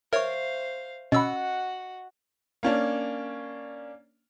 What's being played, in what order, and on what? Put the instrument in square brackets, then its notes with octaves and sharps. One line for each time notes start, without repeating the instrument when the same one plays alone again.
[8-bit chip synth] A#4 C#5 [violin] C5 F5 [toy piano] E5 C#6
[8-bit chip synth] B2 E6 [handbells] C#4 B5 [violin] F#4 F#5 [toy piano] D#5
[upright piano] A#3 C#4 D4